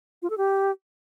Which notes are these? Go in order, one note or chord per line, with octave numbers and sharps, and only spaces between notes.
F4
A4
G4